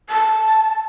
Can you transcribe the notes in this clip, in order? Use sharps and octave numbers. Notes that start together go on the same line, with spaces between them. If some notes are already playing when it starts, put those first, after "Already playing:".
A5